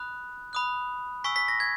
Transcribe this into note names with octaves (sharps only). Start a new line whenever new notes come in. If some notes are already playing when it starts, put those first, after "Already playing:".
Already playing: B5 D#6 F#6
B5 D#6 F#6
G#5 C#6 E6 B6
B6
A#6
G#6